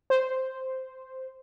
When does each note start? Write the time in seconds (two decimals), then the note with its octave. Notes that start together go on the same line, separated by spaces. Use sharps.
0.10 C5